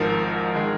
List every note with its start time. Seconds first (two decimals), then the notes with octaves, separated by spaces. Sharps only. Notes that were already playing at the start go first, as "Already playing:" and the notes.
Already playing: G#1 G#2 F3 A#4
0.55 D#3 G#3